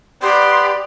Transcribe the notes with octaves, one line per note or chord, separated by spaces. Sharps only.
B3 G4 D5 C6